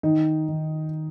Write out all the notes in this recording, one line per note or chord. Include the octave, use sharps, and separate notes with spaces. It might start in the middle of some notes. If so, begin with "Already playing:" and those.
D#3 D#4
D#3